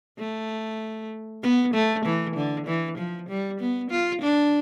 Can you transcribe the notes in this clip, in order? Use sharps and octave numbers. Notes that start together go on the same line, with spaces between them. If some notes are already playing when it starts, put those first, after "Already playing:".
A3
B3
A3
E3
D3
E3
F3
G3
B3
F4
D4